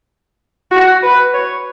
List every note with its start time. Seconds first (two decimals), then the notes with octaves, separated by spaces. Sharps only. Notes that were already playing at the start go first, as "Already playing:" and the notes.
0.71 F#4
1.03 B4
1.34 C#5